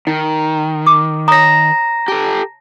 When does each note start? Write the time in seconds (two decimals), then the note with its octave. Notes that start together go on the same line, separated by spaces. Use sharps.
0.07 D#3 D#4
0.86 D6
1.28 C#5 A#5 D#6 A#6
2.08 G4 A4 A5